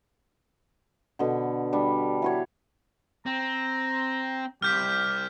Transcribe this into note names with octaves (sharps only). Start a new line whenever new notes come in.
B2 D3
G3 D4
E3 F#4 C#5
C4 A#5
C2 G4 F6 G6 B6